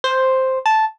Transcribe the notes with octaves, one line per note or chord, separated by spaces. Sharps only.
C5
A5